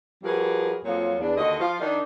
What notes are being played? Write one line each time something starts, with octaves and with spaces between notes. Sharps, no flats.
F3 G3 F#4 G#4 A#4 B4
F2 A#2 F3 F#3 F4 C#5
E2 D4
D#2 D3 F#4 D#5
F3 F4
D#3 D4 D#4